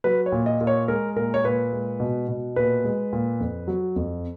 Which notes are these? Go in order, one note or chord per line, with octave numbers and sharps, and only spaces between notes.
F#3 B4
C#5
A#2
D#5
A#2
C#5
G#3 A#4
A#2 A#4
C#5
A#2 B4
G#3
B2
B2
A#2 B4
G#3
A#2
F2
F#3
F2